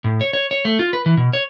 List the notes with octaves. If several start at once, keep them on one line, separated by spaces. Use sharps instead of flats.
A2
C#5
C#5
C#5
A3
F4
B4
E3
B2
C#5